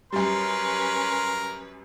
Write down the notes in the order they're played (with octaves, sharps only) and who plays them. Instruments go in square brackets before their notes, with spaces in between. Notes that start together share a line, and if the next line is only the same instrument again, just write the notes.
[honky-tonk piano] F#2 G3 [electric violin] C#4 B4 [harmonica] A#4 [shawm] C6